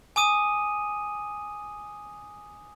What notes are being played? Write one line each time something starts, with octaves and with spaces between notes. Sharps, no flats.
G#5 D6 D#6 D#7